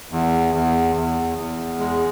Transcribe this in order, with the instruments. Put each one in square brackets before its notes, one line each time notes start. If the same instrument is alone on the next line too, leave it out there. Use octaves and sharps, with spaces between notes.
[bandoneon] E2
E2
E2
E2
G#3